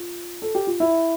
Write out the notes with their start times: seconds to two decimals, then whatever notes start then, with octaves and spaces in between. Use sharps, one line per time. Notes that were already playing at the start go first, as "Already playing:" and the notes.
Already playing: F4
0.42 A4
0.55 G4
0.67 F4
0.80 E4